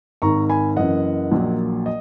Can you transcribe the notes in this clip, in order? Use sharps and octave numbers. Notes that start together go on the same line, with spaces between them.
G#1 G#2 D#3 A#5 C#6
G#5 B5
F#1 F#2 E3 D#5 F#5
A#1 A#2 F#3
D#5